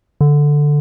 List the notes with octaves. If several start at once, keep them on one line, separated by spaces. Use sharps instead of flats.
D3